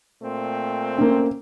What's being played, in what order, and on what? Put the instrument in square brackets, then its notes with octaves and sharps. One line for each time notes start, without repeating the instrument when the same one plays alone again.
[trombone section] A#2 A3 C4
[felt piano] A#3 C#4